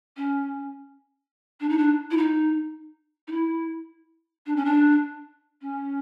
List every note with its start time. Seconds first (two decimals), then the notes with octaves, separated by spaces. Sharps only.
0.17 C#4
1.60 D4
1.69 D#4
1.78 D4
2.11 E4
2.17 D#4
3.28 D#4
3.32 E4
4.46 D4
4.56 C#4
4.65 D4
5.62 C#4